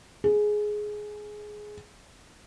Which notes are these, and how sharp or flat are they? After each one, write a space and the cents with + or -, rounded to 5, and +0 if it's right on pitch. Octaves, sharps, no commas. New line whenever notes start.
G#4 +10